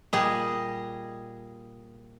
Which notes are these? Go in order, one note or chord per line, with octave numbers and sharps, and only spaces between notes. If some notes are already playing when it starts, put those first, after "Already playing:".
A#2 G3 G#4 D#5